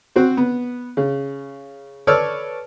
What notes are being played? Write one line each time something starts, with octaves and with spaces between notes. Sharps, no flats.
C4 F#4 C5
B3
C#3
A4 B4 C#5 D5 E6 F6